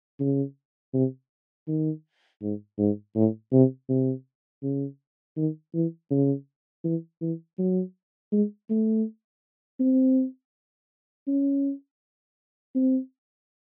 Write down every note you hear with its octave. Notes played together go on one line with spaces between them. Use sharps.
C#3
C3
D#3
G#2
G#2
A2
C3
C3
C#3
D#3
E3
C#3
E3
E3
F#3
G#3
A3
C4
C#4
C4